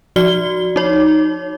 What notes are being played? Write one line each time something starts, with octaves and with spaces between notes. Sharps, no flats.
F3 F#4 D5 G7
D#4 C#5